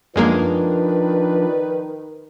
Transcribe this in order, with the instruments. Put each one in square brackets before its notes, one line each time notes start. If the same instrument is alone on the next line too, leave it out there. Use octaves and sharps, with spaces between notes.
[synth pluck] F#2 G#3 A#3 [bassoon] D#3 [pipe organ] F3 D4 [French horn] B4